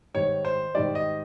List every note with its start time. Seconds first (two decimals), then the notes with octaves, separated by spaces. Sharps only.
0.14 G#2 D#3 G3 C#5
0.45 C5
0.75 G#2 D#3 G3 D5
0.95 D#5